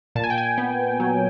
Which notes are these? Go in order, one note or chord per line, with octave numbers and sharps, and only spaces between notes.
A#2 A5
G#5
G5
G#5
B3
F#3